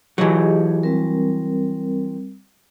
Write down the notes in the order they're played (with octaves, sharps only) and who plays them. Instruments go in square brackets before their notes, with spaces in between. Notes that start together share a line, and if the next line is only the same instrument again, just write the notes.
[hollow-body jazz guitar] E3 F#3 [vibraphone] G4 G#4 D#5
[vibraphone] G3 C4 A#4